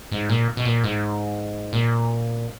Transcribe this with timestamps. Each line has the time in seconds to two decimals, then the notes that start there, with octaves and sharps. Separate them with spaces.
0.12 G#2
0.29 A#2
0.57 B2
0.65 A#2
0.84 G#2
1.73 A#2